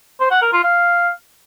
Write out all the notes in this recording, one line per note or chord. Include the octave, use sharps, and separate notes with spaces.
C5
F#5
A#4
F4
F5